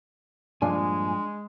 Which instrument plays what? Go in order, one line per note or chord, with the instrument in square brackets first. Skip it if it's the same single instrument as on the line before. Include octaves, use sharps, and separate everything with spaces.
[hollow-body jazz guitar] G2 A#2 F3 [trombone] G#3 [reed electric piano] D4 [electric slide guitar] G#5